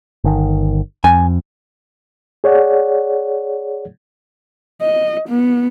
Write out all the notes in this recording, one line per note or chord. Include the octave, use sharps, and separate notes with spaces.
G1 D#3
F2 G#5
G#4 C#5 D5 F#5
D#5
B3